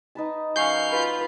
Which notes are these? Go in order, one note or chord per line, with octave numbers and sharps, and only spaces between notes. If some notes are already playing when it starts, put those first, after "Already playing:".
D#4 B4 A5
F#2 F#4 F5 G#5 D#6 G6 C7
F4 B4